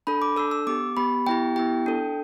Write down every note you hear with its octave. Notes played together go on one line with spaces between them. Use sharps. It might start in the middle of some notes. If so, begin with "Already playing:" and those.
D4 A4 B5
D6
D4 A4 E6
E6
B3 G4 D6
B3 G4 B5
B3 E4 G4 G5
B3 E4 G4 G5
D4 A4